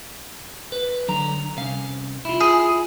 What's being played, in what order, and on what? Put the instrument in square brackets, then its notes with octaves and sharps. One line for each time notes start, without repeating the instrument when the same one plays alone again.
[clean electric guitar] B4
D3 F#3 A#5
C2 C#4 F5
E4 F4
[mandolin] G#4